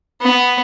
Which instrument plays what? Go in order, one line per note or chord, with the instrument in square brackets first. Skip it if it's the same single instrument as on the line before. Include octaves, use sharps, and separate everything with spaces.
[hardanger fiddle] B3